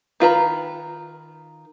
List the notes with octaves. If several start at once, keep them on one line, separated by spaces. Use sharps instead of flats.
D#3 F4 B4 A#5